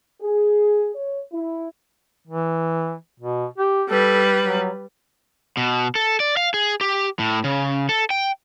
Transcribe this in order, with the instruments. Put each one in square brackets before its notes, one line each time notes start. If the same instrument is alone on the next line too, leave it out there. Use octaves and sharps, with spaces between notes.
[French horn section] G#4
C#5
E4
[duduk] E3
B2
G4
[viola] G3 B4 [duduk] A4
[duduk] F#3
[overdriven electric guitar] B2
A4
D5
F5
G#4
G4
A2
C#3
A4
G5